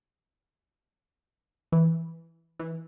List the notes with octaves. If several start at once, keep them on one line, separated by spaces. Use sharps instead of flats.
E3
E3